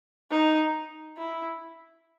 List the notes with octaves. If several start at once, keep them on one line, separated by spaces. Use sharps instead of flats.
D#4
E4